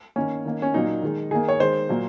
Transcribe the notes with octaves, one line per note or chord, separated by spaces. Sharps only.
D#3 A#3 C#4
D#3 A#3
C#4
A#2 F#3 A#3 D#4
D#3 G#3
D#3 A#3 G#4
C#5
D#3 G#3 C5
A#2 F#3 A#3